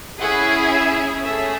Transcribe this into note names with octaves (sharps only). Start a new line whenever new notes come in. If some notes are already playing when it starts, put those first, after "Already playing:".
C#4 E4 G#4 F#5
E5
A3 C#4 G#4 E5